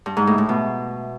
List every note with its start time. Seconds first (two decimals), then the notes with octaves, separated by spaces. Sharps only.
0.06 G2
0.17 G#2
0.27 A2
0.38 A2
0.49 B2